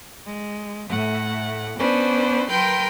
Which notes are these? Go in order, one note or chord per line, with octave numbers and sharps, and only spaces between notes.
G#3
A2 A3 F#5
B3 C#4 D4 B4 C5
F#3 A#4 B4 G5 C6 G6